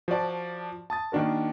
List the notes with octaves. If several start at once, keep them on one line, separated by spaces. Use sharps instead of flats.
F3 F#4 D5 A5
A5 D#6 A6
D#3 A#3 D4 F#4 A#4